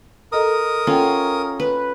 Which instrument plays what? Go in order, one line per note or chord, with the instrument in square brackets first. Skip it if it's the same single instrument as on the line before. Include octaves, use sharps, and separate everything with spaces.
[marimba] A4 D#5 A#5 [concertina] A#4 D#6
[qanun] C#4 F4 [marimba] A4 F#5 G5
[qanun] B4